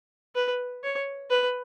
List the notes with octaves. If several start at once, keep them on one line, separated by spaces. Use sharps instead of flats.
B4
C#5
B4